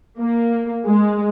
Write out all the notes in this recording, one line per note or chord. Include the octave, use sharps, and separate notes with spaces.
A#3
G#3